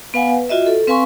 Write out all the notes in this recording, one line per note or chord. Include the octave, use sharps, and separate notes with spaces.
B3 B4 F5 F#5 G#5
B4
F4 F#4 D#5 E5
A4
C4 B4 F5 G#5 C6 C#6